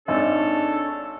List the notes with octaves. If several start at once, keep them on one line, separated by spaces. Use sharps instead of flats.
G#1 D4 D#4 G#4 A4 C#5